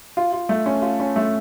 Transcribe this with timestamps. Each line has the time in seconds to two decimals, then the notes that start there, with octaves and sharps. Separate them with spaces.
0.17 F4
0.32 F4
0.49 A3
0.66 C#4
0.82 F4
1.00 C#4
1.16 A3